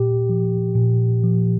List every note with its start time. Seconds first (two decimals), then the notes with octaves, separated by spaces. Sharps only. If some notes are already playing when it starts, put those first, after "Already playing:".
Already playing: A#2 G4
0.29 F3
0.75 A#2
1.24 F3